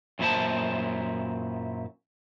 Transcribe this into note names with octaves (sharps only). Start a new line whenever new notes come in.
F#2 A#2 F#3 E4 C5 A5